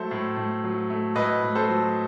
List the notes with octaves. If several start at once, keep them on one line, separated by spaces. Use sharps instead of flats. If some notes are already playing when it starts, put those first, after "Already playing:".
Already playing: F#3 A3 A4 C5
A2
A2
F#3
A3
A2 B4 D#5
A2
A4 C5
F#3